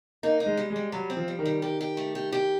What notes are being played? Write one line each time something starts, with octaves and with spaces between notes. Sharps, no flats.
A#3 D#4
D#4
G#3
G3
G#3
G3
F#3 G3
C4
F3
G3
D#3
G3
D#3 G4
G4
A3
G4
G4